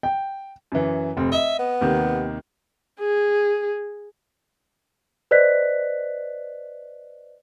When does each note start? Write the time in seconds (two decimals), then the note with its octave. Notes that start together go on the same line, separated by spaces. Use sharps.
0.03 G5
0.72 F#2 E3
1.17 F1 C4
1.32 D#5 E5
1.59 B3
1.81 D#2 C3 D#3
3.00 G#4
5.31 B4 C5 D5 D#5 F#6 B6